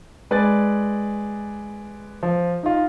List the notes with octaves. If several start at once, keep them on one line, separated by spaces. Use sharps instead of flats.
G#3 B4 D5 G#5 A6
F3
D#4 F4